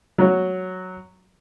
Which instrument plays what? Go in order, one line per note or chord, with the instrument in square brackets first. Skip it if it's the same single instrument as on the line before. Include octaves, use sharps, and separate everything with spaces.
[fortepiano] F#3 F#4